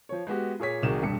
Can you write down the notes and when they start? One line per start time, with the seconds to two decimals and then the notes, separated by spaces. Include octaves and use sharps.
0.09 F3 C#5
0.27 G#3 B3 F#4 G4
0.59 A#2 G#4 C#5 B6
0.82 C2 D#3 F#4 G#4 E7
1.02 E1 G2 C#7